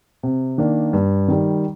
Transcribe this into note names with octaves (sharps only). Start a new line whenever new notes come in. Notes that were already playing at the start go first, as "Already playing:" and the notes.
C3
D#3 A#3 D4
G2
D#3 G3